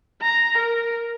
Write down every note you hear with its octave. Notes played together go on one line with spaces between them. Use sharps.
A#5
A#4